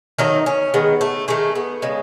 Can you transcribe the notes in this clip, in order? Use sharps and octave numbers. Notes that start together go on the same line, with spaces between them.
D#3 F#3 A3 D#4
C#4
D#3 G#3 B3
A3
D#3 G#3 A3
B3
C#3 G#3